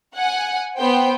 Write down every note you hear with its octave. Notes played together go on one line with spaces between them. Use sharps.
F#5 G#5
B3 C5 G5